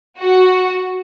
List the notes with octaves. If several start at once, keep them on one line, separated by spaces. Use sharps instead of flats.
F#4